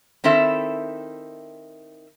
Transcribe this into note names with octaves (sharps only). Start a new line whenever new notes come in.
D#3 C4 E4 A4 E5